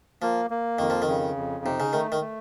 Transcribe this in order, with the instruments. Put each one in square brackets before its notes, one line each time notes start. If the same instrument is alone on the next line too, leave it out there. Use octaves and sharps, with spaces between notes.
[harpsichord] F3 [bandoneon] A#3
[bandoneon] A#3
[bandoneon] F2 [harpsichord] D#3
[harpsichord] F3
D#3
[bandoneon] C#3
F2
[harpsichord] C3 [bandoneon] D#4
[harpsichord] C#3
[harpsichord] D#3 [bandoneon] A3
[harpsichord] D#3
[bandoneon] A3